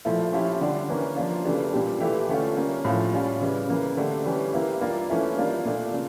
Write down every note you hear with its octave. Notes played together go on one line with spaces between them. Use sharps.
A#2 F3 A3 E4
F3 C#4 E4 G4
D3 G3 D4
E3 A#3 C#4
F3 A#3 D4 F4
C#3 E3 A3 D4 G4
A#2 G3 D4 G4
E3 A3 E4 G4
D3 A3 C#4 F4
G3 A#3 C#4
A2 F3 C#4 F4
G3 C#4 F4
C#3 E3 G3
C#3 E3 A#3
D3 A3 D4 G4
E3 G3 C#4 G4
E3 A#3 E4 G4
G3 A#3 D4 F4
E3 A3 C#4 E4
G3 A#3 D4 F4
A#2 A3 D4
C#3